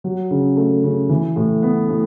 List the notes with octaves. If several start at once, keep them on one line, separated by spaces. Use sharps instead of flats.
F#3
C#3
A3
C#3
E3
A2
B3
A2